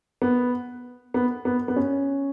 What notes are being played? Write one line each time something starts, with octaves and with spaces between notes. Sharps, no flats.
B3
B3
B3
B3
C#4